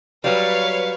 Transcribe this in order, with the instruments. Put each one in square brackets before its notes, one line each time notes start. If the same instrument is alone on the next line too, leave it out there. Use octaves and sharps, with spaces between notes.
[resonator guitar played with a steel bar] F#3 G3 [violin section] B4 C#5 [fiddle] F5